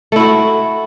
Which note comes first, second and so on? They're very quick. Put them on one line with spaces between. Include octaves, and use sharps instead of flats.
A3 E4 F#4